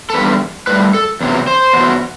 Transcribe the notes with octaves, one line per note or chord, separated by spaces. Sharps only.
A4
E2 D3 G3 B4
A2 G3 B4
A4
E2 C3 F#3
C5
E2 B2 F#3